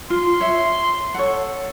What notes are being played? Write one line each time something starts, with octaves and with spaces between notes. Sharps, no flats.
F4 C6
C#5 E5
A4 C#5 F#5